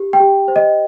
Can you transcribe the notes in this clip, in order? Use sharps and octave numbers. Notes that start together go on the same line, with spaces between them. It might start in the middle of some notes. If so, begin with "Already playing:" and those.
Already playing: G4
G5
G4
C5
D#5